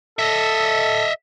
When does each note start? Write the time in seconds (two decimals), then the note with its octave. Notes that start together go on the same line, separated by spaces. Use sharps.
0.19 A4 D#5 E5